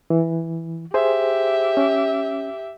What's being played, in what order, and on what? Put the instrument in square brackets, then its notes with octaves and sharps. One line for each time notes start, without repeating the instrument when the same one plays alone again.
[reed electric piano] E3
[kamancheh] G4 E5 [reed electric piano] G#4 C5
[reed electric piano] C#4